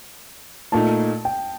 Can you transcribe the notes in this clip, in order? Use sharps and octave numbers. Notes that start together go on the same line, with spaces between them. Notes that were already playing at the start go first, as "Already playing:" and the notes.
A#2 A3 D#4 A5
G5